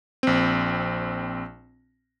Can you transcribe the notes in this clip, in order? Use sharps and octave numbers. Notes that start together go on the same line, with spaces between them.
A#1 C4